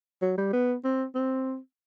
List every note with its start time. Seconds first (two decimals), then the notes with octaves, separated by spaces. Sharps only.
0.22 F#3
0.38 G3
0.53 B3
0.84 C4
1.15 C4